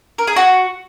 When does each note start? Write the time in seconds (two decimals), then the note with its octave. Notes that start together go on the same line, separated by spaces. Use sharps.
0.18 A#4
0.27 G#4
0.36 F#4